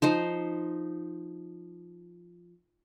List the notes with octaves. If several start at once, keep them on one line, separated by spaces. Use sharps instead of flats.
F3 D#4 C5